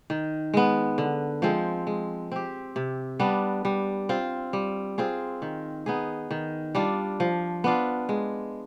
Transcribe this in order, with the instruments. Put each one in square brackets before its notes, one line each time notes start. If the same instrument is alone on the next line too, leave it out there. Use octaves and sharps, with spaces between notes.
[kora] D#3
G#3 B3
D3
F3 G#3 C4
G#3
C4 G4
C3
G3 B3 D4
G3
C4 F4
G3
C4 F4 G#4
D#3
B3 D#4 G#4
D#3
G3 D4 F4
F3
B3 D4 F4
G#3